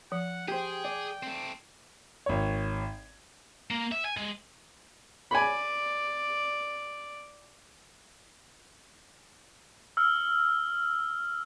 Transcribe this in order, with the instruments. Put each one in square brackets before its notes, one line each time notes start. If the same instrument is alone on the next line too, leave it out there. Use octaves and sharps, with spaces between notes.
[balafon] F3 [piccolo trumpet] F#5
[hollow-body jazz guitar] G4 C5 [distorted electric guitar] G#4 [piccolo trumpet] G5
[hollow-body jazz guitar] D5
[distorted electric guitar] A3 C4
[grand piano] G#1 C#5
[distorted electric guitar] A#3
E5
G#5
G#3
[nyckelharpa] D5 [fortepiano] G#5 B5
[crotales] E6 F6